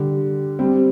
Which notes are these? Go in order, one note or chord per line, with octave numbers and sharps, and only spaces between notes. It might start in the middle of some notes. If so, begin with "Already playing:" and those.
Already playing: D3 G3
G3 C4